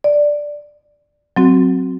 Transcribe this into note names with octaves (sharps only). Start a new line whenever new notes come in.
D5
F#3 C4 F#4